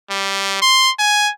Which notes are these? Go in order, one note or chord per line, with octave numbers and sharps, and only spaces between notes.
G3
C6
G#5